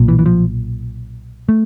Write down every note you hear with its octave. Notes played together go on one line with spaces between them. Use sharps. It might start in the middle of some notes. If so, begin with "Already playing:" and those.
Already playing: B1 A#2
E3
E3
F3
A3